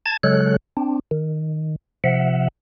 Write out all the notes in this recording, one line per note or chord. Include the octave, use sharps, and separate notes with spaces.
A5 G#6 A6
C#3 F#3 G#3 A4 C#5 F#6
C4 D4
D#3
C3 F3 E5 F#5